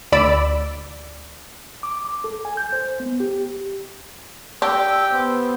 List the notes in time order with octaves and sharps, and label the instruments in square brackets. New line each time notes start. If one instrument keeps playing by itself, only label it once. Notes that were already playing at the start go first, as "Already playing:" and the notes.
[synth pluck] D2 D5 B5 E6 D7
[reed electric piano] D6
D6
A4
G#5
G6
C5
B3
G4
[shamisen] D4 [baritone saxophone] G4 [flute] E6
[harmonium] B3 C5